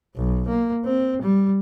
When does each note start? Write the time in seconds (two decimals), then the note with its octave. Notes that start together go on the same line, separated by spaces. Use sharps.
0.16 B1
0.48 A#3
0.85 C4
1.22 G3